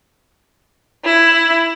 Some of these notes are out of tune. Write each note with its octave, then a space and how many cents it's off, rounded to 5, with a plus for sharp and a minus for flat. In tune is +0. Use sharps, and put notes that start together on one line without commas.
E4 +10